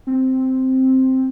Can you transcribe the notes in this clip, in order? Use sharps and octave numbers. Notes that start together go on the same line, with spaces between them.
C4